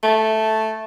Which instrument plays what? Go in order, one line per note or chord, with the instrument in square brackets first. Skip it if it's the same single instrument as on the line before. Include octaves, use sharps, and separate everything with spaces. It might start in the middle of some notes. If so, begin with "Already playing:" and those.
[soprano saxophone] A3